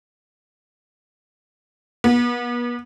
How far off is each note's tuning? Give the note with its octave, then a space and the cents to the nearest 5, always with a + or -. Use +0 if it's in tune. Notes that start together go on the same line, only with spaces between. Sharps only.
B3 -35